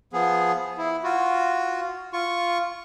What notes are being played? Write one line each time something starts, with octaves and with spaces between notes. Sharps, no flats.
F3 B3 G#4
E4
F4 F#4
F4 C#6